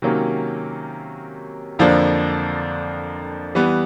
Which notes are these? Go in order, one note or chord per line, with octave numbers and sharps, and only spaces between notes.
C3 D#3 F#3 A#3 C#4
F2 D3 F3 A#3 D4
E3 G3 B3